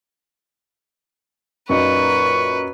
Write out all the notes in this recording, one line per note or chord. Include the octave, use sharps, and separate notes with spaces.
F#2 A#2 D#4 B4 C#6